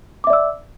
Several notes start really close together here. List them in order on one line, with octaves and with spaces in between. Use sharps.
D6 E5 D5 E6